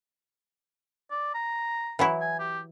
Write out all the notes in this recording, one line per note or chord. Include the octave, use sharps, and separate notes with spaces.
D5
A#5
E3 F#3 E4
G#5
G4